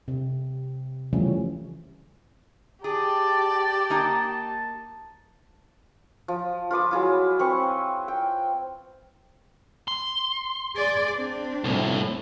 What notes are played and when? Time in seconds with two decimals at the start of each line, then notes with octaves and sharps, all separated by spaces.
0.08 C3
1.13 C#3 E3 F3 G3 A3 C#4
2.84 G4 G#4 D5 A5
3.90 A#3 D#4 G#5
6.28 F3
6.71 F4 B4 D6 D#6
6.91 F#3 G#3 E4 F4
7.39 C4 B4 C#6
8.08 G5
9.88 C6
10.76 G#4 D5
11.15 C4 D4
11.64 C2 A2